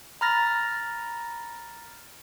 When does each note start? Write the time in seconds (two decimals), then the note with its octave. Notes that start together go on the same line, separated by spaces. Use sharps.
0.21 A#5 B5 F6 A6 A#6